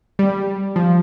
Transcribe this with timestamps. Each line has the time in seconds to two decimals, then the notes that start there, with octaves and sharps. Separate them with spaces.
0.19 G3
0.76 F3